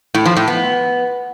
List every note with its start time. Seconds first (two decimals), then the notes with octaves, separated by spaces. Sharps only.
0.14 A2
0.25 F3
0.37 A2
0.48 B3